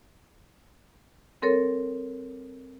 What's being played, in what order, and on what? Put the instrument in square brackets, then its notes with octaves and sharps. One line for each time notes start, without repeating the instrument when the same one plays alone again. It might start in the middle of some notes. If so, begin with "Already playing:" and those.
[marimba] G3 C4 A4 A#4 C#5